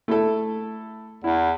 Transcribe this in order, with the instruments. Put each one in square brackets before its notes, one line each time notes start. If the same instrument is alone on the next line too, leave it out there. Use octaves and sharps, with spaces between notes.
[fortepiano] A3 E4 A4
[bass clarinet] E2 [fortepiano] E4